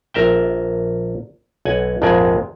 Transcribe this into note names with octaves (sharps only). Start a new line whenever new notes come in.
A#1 A#4 E5 G5
B1 F#5 G#5
A#1 F2 G#2 G#3 D5 G#5